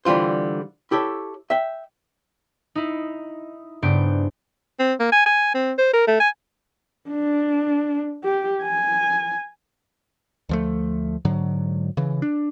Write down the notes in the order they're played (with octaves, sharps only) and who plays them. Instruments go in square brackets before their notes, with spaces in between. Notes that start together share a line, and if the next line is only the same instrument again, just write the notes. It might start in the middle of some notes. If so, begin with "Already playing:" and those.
[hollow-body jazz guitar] D3 E3 G3 F4 C5
E4 G4 A4 C#5
E5 G5
[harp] D#4 E4
G2 C#3 B3 C5 D5 D7
[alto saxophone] C4
A#3
G#5
G#5
C4
C5
A#4
A3
G#5
[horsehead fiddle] D4
G4
G#5
[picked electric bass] D2 F3 A3
G#2 D3 F#3
C#3 E3
D4